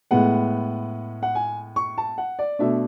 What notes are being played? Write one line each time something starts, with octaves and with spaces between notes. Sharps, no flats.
A2 G#3 B3 F#5
F#5
G#5
C#6
A5
F#5
D5
B2 A3 D4 E5